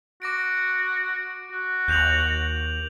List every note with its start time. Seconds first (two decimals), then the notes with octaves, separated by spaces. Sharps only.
0.22 F#4 D6 A#6 D7
1.52 F#4
1.88 D#2 G6 F7 F#7